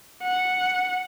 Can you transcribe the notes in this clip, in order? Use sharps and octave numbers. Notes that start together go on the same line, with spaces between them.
F#5